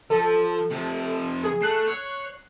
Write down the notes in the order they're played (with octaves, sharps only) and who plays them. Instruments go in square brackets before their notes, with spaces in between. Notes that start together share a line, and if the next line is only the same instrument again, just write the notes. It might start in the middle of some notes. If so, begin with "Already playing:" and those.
[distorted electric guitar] F3 [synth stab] A4
[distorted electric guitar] C3 F3
[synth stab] G#4
[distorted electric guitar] A3 [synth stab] F#6 C7
[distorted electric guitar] C#5